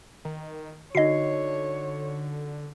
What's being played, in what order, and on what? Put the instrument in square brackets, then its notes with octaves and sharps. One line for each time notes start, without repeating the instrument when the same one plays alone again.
[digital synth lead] D#3
[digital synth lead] D3 [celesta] D#4 F#4 [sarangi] C#5 [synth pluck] D#5 C7